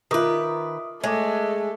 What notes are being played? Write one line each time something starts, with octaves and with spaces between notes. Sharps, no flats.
D#3 F4 A#4 B4 E5 D6 D#6
G#3 A3 C#5 D#5 D6